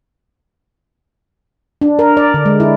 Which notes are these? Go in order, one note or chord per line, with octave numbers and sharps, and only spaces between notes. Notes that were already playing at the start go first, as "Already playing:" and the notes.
D4
A#4
D5
D3
G#3
E4